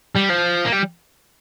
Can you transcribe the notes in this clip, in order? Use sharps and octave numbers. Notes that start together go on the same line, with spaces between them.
G3
F3
A#3
G3